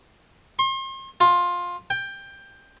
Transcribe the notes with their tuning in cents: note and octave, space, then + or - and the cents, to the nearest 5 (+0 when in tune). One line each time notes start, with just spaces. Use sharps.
C6 +40
F4 +15
G5 +15